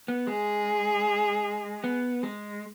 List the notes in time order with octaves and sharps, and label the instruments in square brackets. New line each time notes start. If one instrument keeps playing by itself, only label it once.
[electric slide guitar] B3
[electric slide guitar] G#3 [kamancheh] G#4
[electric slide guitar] B3
G#3